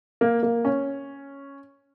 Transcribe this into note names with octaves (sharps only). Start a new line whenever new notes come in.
A#3
A#3
C#4